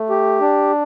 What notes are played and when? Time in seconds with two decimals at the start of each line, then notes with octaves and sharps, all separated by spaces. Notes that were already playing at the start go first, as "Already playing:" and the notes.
Already playing: A3
0.10 G4
0.41 D4